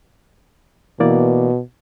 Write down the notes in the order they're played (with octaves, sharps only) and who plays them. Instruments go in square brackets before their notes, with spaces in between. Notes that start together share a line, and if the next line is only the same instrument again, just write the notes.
[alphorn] B2 [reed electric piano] E3 A#3 D5